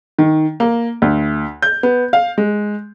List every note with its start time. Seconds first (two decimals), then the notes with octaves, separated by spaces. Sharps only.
0.19 D#3
0.60 A#3
1.02 D2
1.62 G6
1.83 B3
2.13 F5
2.38 G#3